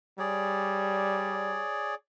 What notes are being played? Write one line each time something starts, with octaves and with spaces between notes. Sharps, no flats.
G3 G#4 C#5 D5